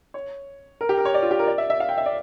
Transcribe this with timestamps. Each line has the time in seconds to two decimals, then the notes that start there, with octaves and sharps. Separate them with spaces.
0.14 C#5
0.81 A#4
0.89 G4
0.98 A#4
1.05 C#5
1.14 D5
1.22 F4
1.31 G4
1.39 A#4
1.47 D5
1.58 E5
1.70 E5
1.80 F5
1.89 G5
1.98 E5
2.06 D5